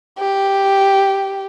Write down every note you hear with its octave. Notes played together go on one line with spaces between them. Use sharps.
G4